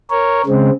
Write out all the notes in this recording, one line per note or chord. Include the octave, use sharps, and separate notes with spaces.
A#4 C#5
C#3 G#3 C4